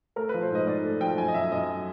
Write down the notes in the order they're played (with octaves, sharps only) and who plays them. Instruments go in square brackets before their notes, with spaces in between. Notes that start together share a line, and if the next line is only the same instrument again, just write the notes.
[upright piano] A3 A#4
B4
F3
C5
G#2 D#5
G#2 D5
A3
F3 G5
F#2 G#5
D#5
F#2 E5
F#2 D#5